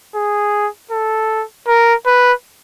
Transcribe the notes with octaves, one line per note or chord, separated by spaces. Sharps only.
G#4
A4
A#4
B4